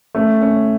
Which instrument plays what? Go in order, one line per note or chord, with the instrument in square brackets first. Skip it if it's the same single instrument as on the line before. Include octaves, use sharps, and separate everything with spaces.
[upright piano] A3 [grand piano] C#4
[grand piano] C#4